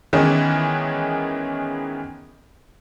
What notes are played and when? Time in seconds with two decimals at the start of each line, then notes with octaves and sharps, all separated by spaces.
0.13 D#3 E3 G#3 B3 C#4